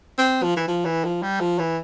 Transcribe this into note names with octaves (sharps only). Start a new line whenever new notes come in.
C4
F3
E3
F3
E3
F3
G3
F3
E3